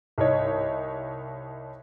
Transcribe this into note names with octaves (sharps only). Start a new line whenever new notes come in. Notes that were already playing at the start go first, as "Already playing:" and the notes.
C2 D#4 C#5